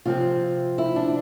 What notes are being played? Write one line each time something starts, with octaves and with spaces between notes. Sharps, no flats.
C3 F3 C4 F4
E4
D4